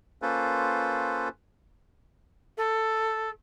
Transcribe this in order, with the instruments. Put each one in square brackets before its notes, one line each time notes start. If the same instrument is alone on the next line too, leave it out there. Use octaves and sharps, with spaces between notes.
[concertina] A#3 C#4 F4 A4 B4 C5
[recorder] A4